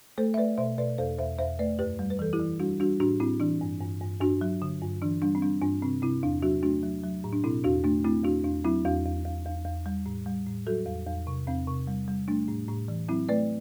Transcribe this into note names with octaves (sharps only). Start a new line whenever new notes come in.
A3 A4 C5
E5
A3 B4 D5
B2 C5 E5
B2 B4 D5
E2 A4 C5
E2 C5 E5
E2 C5 E5
A3 B4 D5
F#2 G4 B4
G3
B4
E3 A4
E4 G4
E3
G3 D4 F#4
G3 D4 F#4
A2 D4 F#4
A2 C4 E4
E3 D4
G2
G2
G2
G2 D4 F#4
F#3
D3
G2
E3 D4
G3 D4
C4
G3 D4
G2 D4
C3 C4
C3 C4 E4
E2 D4
F#3 D4 F#4
A3 D4 F#4
F#3
F#3
A2
D4
B2 C4 E4
E2 D4 F#4
A3 D4
A3 C4 E4
E2 D4 F#4
E2 D4
F#3 C4 E4
E2 D4 F#4
E2
E2
E2
E2
G3
A2
G3
A2
F#3 F#4 A4
E2
E2
C3
E2 C4
C3
G3
G3
A3 D4
A2
A2
E3
F#3 C4 E4
A3 B4 D5